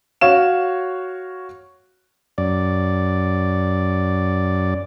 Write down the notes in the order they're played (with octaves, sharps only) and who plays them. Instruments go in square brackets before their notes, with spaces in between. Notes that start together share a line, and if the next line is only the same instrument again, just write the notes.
[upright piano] F#4 C#5 F5 E7
[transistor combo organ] F#2 D5